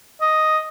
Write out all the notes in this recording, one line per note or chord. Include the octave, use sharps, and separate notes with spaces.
D#5